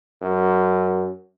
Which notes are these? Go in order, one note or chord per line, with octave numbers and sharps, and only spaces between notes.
F#2